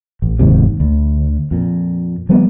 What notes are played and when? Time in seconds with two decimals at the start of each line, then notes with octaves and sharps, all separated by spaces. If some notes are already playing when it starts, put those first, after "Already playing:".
0.22 A1
0.39 F1 D#2 G#2 C3
0.80 D2
1.51 F2 A#2
2.29 F3 G3 A#3 B3